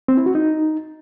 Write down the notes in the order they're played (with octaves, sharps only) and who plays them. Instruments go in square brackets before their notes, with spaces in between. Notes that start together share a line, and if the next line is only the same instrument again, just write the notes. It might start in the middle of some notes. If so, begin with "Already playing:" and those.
[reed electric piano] C4
E4
F#4
D#4